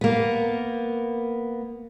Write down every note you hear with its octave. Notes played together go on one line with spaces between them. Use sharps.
A#3 B3